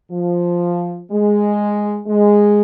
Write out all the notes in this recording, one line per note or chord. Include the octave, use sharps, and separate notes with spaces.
F3
G#3
G#3